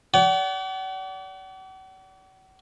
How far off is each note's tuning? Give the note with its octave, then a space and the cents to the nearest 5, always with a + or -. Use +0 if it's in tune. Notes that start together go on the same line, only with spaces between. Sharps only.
D5 -40 F#5 +40